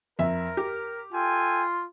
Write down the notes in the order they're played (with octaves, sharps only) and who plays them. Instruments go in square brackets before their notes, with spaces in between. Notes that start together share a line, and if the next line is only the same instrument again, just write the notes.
[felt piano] F2 E5 [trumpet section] A#4
[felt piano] G4
[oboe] F4 [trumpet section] A4 G5 G#5